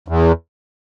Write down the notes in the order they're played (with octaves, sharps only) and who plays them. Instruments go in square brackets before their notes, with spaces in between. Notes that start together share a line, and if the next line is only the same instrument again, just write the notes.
[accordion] E2